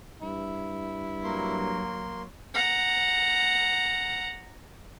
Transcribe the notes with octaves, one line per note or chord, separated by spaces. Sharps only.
G2 E4
F#3 A#3 C6
F#5 A#5